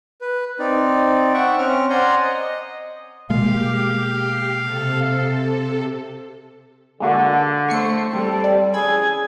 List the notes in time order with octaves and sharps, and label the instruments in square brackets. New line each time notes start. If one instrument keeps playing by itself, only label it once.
[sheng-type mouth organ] B4
C4 D#4 D5
E5 F#5 G5 C#6
C4 C#4 F6
C5 D5 F#5 G#5 A#5 C6
D#5
[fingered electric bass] B2 G#3 A#3 [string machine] G4 [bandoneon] F5
[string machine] C3 A4
[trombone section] D3 [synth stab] G#3 A#3 F#4
[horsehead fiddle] A3 C5 [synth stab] C#6 C7 C#7
[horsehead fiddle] G3 [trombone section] C4 A4
[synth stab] D5
[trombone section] C#4 G#4 [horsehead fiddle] G#5 [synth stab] B5 E6